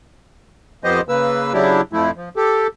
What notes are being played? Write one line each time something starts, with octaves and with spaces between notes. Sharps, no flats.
F2 F3 B3 G4 C5 D#5
C#3 A#3 B4 E6
C#3 F#3 D4 E4 G4
F2 F3 A3 E4
F3
G4 A4